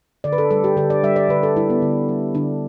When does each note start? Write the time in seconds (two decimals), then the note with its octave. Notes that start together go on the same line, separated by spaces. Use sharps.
0.24 D3 D5
0.33 B4
0.38 A4
0.51 G3 A4
0.64 G4
0.77 D3 A4
0.90 D5
1.04 G3 E5
1.16 D5
1.29 D3 B4
1.43 A4
1.57 G3 E4
1.70 B3
1.82 D3
2.09 G3
2.35 D3 D4